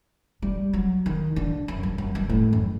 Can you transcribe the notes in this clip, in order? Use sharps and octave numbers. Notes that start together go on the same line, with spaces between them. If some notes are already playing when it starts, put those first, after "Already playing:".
G3
F#3
D#3
D3
F#2
G2
F#2
G2
A2
F#2